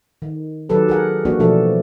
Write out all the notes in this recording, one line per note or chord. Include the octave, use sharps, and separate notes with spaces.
D#3
D#3 F#3 G4 A4 B4
G#4 A#4 F#5
E3 G3 A#3 D4 F#4
B2 E3 F3 A3 D4 A4